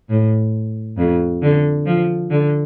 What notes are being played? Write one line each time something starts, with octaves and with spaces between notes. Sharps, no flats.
A2
F2
D3
F3
D3